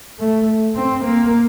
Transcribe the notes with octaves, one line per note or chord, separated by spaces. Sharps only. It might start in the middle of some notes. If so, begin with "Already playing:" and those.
A3
C4
A#3